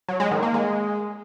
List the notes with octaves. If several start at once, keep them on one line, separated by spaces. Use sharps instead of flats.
F#3
G#3
D#3
A#3
G#3